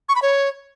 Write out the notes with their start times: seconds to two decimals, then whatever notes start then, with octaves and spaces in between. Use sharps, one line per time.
0.09 C#6
0.16 B5
0.22 C#5